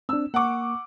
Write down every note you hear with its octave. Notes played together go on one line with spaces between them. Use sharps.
C4 D4 E6
A#3 F#5 C#6 D6